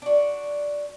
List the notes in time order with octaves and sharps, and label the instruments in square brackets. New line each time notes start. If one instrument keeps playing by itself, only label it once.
[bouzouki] D4 F#4